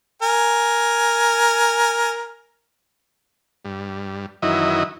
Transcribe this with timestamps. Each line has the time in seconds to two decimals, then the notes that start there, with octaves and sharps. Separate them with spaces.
0.22 A#4 G#5
3.65 G2
4.42 F#2 D#3 E3 F#3 E4 D#5